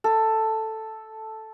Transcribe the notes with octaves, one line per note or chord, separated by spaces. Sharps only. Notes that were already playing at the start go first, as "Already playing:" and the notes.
A4